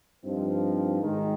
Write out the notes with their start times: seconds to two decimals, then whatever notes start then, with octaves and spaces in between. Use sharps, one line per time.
0.25 G2 F3 C4 D#4
1.01 G#1 G#2 D#3 G#3